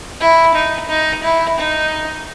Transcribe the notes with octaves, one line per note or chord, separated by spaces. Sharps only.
E4
D#4
D#4
E4
D#4